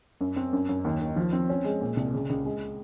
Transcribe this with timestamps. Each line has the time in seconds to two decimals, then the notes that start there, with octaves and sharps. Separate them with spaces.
0.21 F#2
0.36 C4
0.53 F#2
0.69 F#2
0.85 D#2
1.01 D#3
1.16 F3
1.32 C4
1.50 C#4
1.64 G#3
1.81 A#2
1.97 C2
2.14 C#3
2.30 C#2
2.45 G#3